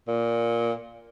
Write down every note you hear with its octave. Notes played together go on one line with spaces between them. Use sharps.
A#2